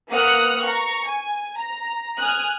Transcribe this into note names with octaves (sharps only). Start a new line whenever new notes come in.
A#3 B4 F#5 D#6 F6 F#6
A#5 C#6
G#5
A#5
G#5 D#6 F6 F#6